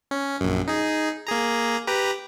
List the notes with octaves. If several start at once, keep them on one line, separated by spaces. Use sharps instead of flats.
C#4
A#1 F#2
D#4 G#4
A#3 G#4 A#5
G4 B4 A#5